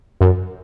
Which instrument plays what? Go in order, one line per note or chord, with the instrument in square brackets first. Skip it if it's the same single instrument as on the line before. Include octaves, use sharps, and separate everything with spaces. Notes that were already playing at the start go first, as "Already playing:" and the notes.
[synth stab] F#2